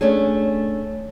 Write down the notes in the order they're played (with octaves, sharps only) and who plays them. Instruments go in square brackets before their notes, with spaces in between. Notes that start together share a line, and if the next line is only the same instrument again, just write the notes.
[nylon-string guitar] A3 C#4 D4 G#4